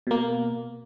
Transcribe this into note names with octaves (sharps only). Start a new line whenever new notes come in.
B2 A#3